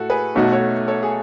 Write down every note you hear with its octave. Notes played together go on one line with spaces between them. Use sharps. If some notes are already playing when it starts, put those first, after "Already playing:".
Already playing: A2 A3 F#4 A4
G#4 B4
B1 B2 A3 D#4 F#4 C#5
A4 C#5
A4 C#5
G#4